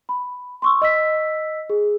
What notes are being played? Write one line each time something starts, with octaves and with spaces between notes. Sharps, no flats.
B5
C6 C#6 E6
D#5 E6 B6
G#4